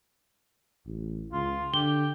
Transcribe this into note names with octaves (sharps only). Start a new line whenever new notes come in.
A1
C#2 F4
D3 G4 G7